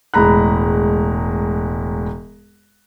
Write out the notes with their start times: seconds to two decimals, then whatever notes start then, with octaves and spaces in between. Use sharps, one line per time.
0.14 E1 A2 G#3 A#5 B5 F#6